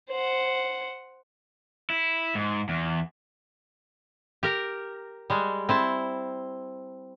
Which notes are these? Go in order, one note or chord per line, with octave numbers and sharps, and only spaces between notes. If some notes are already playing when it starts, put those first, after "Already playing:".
C5 F#5
E4
G#2
E2
G4 A#4 A#5
G3 G#3
C4 E4 A5